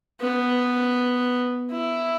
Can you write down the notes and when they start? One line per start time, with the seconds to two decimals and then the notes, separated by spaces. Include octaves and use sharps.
0.21 B3
1.71 E4